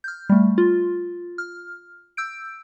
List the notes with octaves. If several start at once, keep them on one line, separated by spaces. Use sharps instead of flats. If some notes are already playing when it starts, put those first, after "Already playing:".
F6 G6
G3 A3
F4
F6
E6 G6 D7